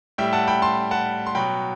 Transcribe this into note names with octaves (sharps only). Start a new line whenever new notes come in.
A2 G3 E5 G5
F#5 A5
G5 B5
A5 C6
F#5 A5
C6
B2 F#3 G5 B5